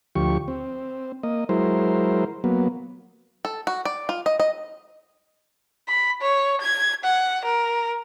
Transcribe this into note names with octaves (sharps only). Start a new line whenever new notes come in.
D2 F3 G4 C#6
C4
A#3 D#5
F#3 G#3 E4 A#4 C5
F#3 A#3 B3
A4
F#4
D5
F4
D#5
D#5
B5
C#5
G#6
F#5
A#4